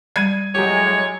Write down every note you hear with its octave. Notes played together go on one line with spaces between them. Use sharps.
G3 G#6 D#7
A2 F#3 G#3 G4 C#5